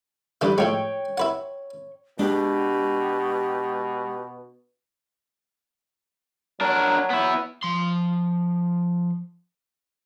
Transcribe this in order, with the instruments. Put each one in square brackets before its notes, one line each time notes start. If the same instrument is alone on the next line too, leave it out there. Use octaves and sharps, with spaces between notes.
[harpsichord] G2 D3 E3 [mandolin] B4 D6 G6
[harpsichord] A2 F3 G#3 [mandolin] C#5 G5
[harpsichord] E4 B4 F#5
[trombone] B2 [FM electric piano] G#3 [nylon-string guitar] D4 [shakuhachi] G4
[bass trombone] F#3 [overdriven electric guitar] D4 A#4
[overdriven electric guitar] B3 E4
F3 C6